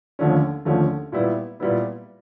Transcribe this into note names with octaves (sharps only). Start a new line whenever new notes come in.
D#2 D3 F3 A3 C#4
D#2 D3 F3 A3 C#4
A#2 G3 B3 E4
A#2 G3 B3 E4